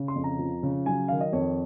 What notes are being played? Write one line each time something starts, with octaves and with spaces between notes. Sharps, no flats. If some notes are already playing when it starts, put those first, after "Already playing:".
Already playing: C#3
C6
F2
A#5
F3
C#3
F#3 G#5
D#3 F5
D#5
F2 C#5